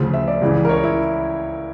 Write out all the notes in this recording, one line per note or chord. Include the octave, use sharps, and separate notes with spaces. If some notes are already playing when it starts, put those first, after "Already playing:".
Already playing: D2 C#3 F3
E5
D5
C#2 C#3 E3
A#4
C#5
E4